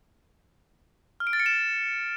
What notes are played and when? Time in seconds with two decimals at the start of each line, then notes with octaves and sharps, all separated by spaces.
1.20 F6
1.27 D7
1.33 A6
1.40 C#7
1.46 E7